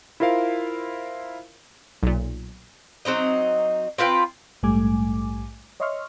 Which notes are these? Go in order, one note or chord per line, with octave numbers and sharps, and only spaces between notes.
E4 F4 A#4 C5 F5
B1 A#2
F#3 C4 D#4 D#5
C4 F4 B4 G5
A#1 G#2 G3 A3 G#5 D6
C#5 D#5 E5 C6 C#6 F6